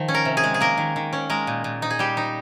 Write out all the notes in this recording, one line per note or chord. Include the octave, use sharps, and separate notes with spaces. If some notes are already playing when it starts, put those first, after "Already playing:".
Already playing: D#3 F3
C#4
A#4
C3
G#4
G#3
G#4
A#3 A#4
D#3
D#3
C#4
G#3 A#4
A#2
A#2
D#4
G#4
G3 G4
D#4